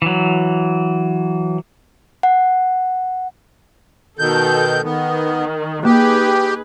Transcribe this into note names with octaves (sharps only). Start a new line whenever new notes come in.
E3 F#3
F#5
B2 D#3 A4 G6
D#3 B3
A#3 D#4 G4 G#4 B4